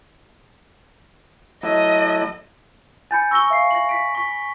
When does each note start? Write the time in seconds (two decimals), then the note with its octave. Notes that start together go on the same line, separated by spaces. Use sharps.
1.63 F#3 A3 E4 D#5
3.11 G#5 B5 G6 A6 C#7
3.31 B5 C#6 E6 A#6 G7
3.50 E5 F5 C7
3.71 A#6 F#7
3.89 B6 D7
4.15 C#6 B6 G7